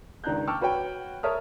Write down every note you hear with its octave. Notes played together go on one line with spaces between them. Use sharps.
C#2 D#3 D4 A#5 F#6 G6
G5 A5 C#6 D6 E6 F6
F#4 B4 C#5 G5
A#4 C#5 E5 A5 D#6 F6